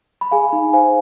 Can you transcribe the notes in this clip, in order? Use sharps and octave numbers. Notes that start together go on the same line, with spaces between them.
B5
G#4 F5 G#5
D#4
C5 F5 G#5